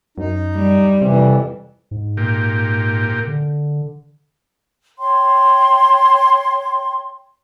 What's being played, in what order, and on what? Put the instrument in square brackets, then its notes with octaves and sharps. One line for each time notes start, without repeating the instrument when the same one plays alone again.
[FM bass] F#2 [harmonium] D#4
[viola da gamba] G3
[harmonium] F2 E3 [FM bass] C3
[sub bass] G#2
[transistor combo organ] A#2 G4
[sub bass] D3
[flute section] C#5 G5 C6